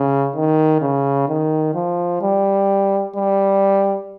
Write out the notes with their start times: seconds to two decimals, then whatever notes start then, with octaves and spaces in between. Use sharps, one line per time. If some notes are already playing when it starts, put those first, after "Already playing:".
Already playing: C#3
0.35 D#3
0.82 C#3
1.28 D#3
1.75 F3
2.22 G3
3.16 G3